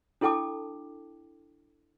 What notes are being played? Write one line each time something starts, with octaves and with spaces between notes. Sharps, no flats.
D4 E4 A4 G5 A5 D6